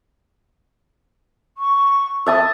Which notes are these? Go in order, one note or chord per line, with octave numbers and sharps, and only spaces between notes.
C#6
E5 A5 D#6